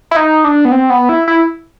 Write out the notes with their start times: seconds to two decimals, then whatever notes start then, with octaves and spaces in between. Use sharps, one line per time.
0.11 E4
0.16 D#4
0.44 D4
0.65 B3
0.72 C4
0.90 B3
1.09 E4
1.28 E4